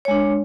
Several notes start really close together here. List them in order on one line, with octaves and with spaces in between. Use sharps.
C#5 G#3 D4